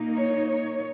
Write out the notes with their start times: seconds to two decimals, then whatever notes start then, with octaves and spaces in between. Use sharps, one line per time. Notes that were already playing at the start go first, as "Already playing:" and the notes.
Already playing: A#2 A#3 D#4
0.17 C#5
0.49 C#5